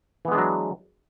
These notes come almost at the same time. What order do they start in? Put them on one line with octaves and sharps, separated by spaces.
E3 B3 G#3 D4 F#3